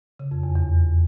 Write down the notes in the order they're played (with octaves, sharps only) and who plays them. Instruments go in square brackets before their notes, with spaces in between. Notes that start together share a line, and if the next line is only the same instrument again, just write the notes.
[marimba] C#3
F2
E2
E2